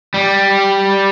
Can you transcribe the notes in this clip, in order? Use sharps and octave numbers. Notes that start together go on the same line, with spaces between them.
G3